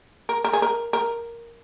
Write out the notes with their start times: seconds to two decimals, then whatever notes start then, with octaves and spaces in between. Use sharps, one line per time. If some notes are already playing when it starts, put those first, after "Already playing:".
0.29 A#4
0.44 A#4
0.53 G#4
0.62 A#4
0.93 A#4